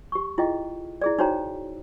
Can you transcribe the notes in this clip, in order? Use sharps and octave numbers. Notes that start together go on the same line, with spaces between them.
G4 C#6
E4 F4 G#4 D#5 G5
E4 G#4 D5
D#4 F#4 C5 C#5 G5 A#5